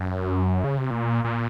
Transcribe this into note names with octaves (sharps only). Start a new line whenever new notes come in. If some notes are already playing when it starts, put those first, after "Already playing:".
Already playing: F#2
C#3
C3
A#2
A#2